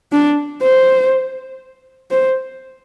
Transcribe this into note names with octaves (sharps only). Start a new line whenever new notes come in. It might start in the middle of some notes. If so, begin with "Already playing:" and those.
D4
C5
C5